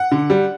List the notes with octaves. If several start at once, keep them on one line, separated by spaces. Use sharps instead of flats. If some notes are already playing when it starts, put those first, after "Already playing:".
Already playing: F#5
D3
G3